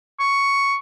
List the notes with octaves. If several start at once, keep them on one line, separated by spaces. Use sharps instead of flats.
C#6